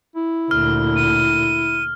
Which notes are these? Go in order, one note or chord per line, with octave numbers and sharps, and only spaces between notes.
E4
D2 A#2 F6
D#7